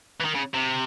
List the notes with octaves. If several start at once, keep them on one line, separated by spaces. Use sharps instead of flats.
E3
D#3
C#3
C3